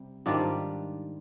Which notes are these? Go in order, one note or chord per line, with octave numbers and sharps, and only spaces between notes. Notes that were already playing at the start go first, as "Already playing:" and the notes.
Already playing: C3 G3
G#2 D#3 G3 D4 F4